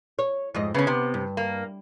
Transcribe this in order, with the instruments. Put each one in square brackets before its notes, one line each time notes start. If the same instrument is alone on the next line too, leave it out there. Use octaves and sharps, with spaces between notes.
[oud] C#5
F2 G#2 D#5
[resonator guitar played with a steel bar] C#3 C#4 [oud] B3
[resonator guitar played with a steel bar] C3
[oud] G2
[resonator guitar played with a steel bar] A#3